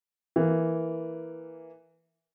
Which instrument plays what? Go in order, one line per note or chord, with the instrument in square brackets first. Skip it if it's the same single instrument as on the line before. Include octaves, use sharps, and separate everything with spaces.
[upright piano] E3 A#3